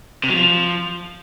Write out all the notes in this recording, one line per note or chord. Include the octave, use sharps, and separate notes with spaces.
C3
F#3
F3